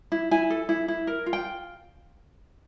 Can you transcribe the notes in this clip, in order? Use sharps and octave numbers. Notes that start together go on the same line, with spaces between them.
E4
E4 G#5
A4
E4
E4
A#4
F4
G5